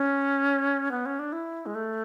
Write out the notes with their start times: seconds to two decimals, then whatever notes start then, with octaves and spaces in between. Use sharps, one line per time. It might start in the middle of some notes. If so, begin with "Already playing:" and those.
Already playing: C#4
0.91 B3
1.06 C#4
1.19 D4
1.32 E4
1.66 G#3
1.75 A3